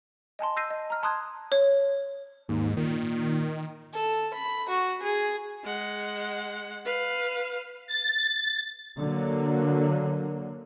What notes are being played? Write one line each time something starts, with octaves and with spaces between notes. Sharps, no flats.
D#5 G#5 A5 C6
E6 G6 A#6 C7 D#7
D#5
A#5 F6
A5 C6 D#6 F#6 G#6
C#5
D#2 G#2
A#2 D#3
A4
B5
F#4
G#4
G#3 F#5
B4 F5
A6
D3 F#3 A#3